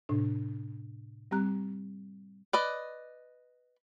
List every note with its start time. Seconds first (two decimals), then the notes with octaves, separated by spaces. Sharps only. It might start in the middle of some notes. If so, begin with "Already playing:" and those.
0.09 A2 C3 D4
1.31 G3 C4 G4 A#5 F#6
2.53 B4 D5 D#5